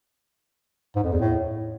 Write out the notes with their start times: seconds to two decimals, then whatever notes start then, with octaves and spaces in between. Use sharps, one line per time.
0.96 G#2
1.04 F2
1.12 E2
1.20 A2